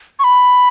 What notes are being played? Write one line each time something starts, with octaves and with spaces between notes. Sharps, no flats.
C#6
B5